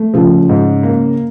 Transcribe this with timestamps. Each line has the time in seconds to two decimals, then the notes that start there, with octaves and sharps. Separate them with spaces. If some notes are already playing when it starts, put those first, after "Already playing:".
Already playing: A3
0.14 C#3 F3
0.49 G#2
0.83 A#3